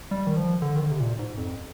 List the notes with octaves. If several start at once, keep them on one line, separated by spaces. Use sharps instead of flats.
G3
D#3
F3
D3
D#3
D3
C3
A#2
G#2
F2